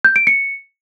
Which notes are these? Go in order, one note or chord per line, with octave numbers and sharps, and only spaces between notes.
G6
D7
C#7